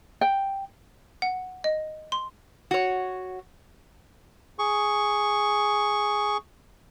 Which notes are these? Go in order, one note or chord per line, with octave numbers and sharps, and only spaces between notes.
G5
F#5
D#5
C6
F#4 C#5
G#4 C#6